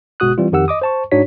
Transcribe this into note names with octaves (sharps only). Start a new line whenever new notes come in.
G1 B2 G#3 F#4 D#6 F#6
E3 G3 C4 F4
F2 D#3 G4 F#5 E6
D#5 D6 D#6
C5 A5 C#6
G#2 D4 D#4 F#4 C#5 B6